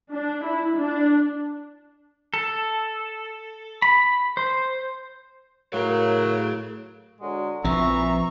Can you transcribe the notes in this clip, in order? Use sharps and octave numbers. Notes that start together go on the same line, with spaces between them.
D4
E4
D4
A4
B5
C5
A2 F#3 G#4 A#4 F5
D3 F#3 G#3 F#4
A#1 E3 F3 C4 E4 E5 A#5 C#6